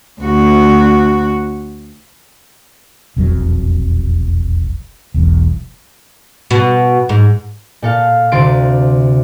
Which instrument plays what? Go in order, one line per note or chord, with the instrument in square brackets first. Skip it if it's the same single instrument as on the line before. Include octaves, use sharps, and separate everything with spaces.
[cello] D2 F#4
[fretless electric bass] E1 A#1 F2 F#3
E1 B1 E2
[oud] B2
G#2
[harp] A#2 A4 F5
D2 C3 C6 A6 D7